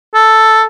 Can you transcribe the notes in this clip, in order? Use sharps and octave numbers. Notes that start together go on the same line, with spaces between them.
A4